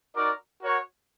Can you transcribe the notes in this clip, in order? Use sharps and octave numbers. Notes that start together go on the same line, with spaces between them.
D#4 F#4 A#4 D5
F#4 A#4 C#5 F#5